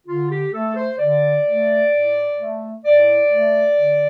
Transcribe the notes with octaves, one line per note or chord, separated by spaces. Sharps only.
D3 F4
G4
A3 A4
C5
D3 D5
A3
A2
A3
A2 D5
A3
D3